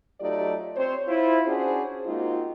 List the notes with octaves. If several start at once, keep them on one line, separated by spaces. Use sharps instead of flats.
F#3 A3 D#4 F4 G4 D5
C4 C5 C#5
E4 F4 C5
C#4 D4 F#4 G#4 C5
G#3 A#3 C4 D#4 F4 F#4